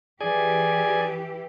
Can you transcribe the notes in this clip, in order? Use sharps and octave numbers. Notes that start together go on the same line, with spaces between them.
E3 G4 G#4 D5 G#5